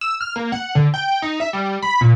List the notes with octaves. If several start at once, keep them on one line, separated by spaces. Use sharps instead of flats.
E6
F6
A#3
F#5
D3
G5
D#4
E5
G3
B5
A#2